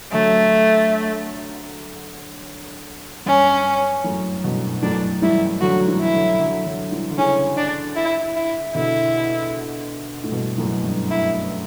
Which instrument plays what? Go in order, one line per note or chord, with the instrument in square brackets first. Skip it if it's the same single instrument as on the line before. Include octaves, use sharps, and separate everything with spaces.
[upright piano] D3 F#3 [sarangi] A3
[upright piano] G2 [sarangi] C#4
[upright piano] F#2 A2
G2 B2
[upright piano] F#2 A2 [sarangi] D4
[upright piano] E3 G3 [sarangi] E4
[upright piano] D3 F#3 [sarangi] F#4
[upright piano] E3 G3
[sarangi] E4
[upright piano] D3 F#3
D3 F#3
D3 F#3
E3 G3
D3
[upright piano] C#3 E3 [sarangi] C#4
[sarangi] D4
E4
E4
[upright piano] B2 D3 [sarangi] E4
[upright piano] A2
G2 B2
F#2 A2
G2
[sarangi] E4